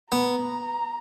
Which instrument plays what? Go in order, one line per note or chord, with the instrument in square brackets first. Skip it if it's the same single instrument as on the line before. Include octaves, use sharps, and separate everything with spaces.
[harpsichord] B3 [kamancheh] A#5